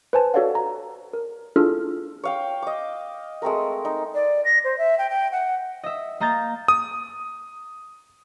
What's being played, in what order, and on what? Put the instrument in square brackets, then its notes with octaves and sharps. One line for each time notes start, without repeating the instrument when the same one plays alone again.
[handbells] B4 C5 G#5 A5
F#4 A4 C#5 D5 F5 F#5
A#5
A#4
D4 E4 F4 G#4 A4 F6
[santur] C#5 F5 G5
D#5 D6
G#3 A3 C4 A#4
D#4
[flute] D5
A#6
C5
E5
G5
G5
F#5
[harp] D#5 E5
A#3 D#5 A#5 G6 A6
[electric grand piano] D#6